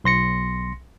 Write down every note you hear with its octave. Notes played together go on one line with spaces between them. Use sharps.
B1 C6 A#6 C#7